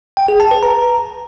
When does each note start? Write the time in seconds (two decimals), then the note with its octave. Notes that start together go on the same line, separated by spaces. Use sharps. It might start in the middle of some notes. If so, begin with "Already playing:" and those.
0.17 G5
0.28 G#4
0.40 A5
0.51 B4
0.63 A#5